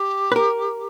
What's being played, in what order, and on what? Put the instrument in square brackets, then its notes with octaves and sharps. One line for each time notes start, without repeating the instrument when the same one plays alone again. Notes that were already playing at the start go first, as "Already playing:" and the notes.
Already playing: [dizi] G4
[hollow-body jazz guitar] B4
A#4